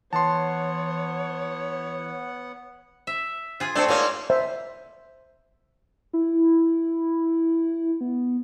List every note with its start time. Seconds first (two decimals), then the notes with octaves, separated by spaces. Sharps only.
0.13 E3 B3 C#5 F#5 A5 C6
3.07 E5
3.60 F4 G#4
3.76 A3 C4 D4 C#5
3.88 G#2 A#3 C#5 G#5
4.30 C5 E5
6.13 E4
8.01 B3